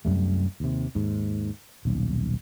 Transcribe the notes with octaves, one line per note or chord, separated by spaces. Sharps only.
C2 F#2 G3 A3
D#2 C3
D#2 G#2
D#1 B1